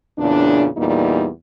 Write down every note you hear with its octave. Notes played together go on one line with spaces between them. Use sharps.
E2 A#2 C#3 D4
E2 A#2 G3 A#3 D#4